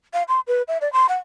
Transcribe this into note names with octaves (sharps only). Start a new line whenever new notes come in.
F5
C6
B4
E5
D5
C6
F#5